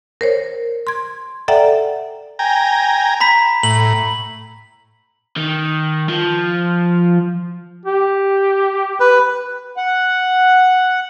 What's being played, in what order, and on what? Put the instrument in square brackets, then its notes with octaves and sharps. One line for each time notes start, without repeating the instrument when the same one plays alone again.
[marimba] A#4 C5 C#5
C6 G#6
A4 D5 E5 F#5 G5 A#5
[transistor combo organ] G5 G#5 A#5
[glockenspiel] A#5 B5 B6
[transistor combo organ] A2 [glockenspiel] F#7
[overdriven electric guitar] D#3
F3
[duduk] G4
[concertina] B4
[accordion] F#5